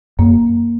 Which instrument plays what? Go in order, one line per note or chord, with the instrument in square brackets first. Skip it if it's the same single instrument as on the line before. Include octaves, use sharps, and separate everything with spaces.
[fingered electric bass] F#2 [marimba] A#3